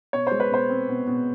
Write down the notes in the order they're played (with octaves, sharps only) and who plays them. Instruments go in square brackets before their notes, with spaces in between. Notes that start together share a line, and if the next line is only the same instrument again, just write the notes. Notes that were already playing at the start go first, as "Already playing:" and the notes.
[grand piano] B2 C#5
G#3 C5
B4
B2 C5
C4
B2
B2